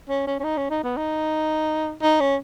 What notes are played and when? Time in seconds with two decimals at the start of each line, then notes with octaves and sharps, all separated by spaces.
0.09 C#4
0.27 C#4
0.40 C#4
0.44 D#4
0.57 C#4
0.70 D#4
0.84 B3
0.97 D#4
2.02 D#4
2.20 C#4